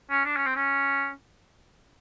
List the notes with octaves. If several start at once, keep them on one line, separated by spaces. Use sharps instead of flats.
C#4
D4
C#4
C4
C#4